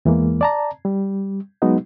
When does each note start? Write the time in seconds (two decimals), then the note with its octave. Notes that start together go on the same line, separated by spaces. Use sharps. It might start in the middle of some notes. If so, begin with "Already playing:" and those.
0.05 E2 E3 G#3 A#3
0.41 D5 A5 A#5
0.85 G3
1.62 F#3 G#3 B3 D#4 F#4